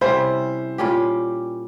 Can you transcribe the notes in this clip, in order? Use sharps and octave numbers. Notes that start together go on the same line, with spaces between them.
C3 G3 C#4 E4 C5
A#2 G3 C#4 G4